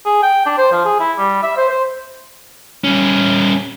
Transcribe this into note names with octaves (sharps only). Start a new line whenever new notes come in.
G#4
G5
D4
C5
F3
G#4
E4
G3
E5
C5
C5
G3 C#4